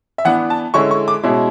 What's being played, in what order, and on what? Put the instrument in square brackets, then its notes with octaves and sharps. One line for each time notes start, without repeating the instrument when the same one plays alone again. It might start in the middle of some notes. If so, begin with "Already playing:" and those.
[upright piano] E5
E3 B3 D4 F#5
A5
D3 G#3 C#4 E4 C#6
C#6
D6
B2 G#3 C#4 E4